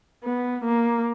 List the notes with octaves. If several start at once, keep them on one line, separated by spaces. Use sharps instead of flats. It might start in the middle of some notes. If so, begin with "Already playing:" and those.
B3
A#3